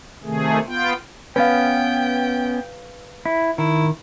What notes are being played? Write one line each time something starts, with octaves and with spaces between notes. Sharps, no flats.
C3 D#3 A3 G#4
B3 F4 G5
B3 C#4 B4 F5 G5
E4
D#3 E4